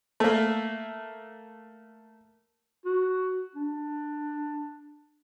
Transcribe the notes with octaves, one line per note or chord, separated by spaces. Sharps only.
A3 A#3
F#4
D4